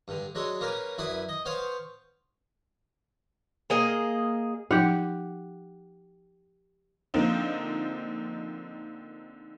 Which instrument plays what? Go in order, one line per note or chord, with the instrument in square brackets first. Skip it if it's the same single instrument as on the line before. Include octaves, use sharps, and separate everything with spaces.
[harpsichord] G2 D3
F#3 G#3 D4 A4
A#3 C#4 A#4 B4
F#2 E4 B4 D5 D#6
D#5
B3 C5 C#5 F5
[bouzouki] A#3 G#4 D#5
[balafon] F3 D#4 [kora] G4 F#5
[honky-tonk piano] D3 F3 A#3 C4 D#4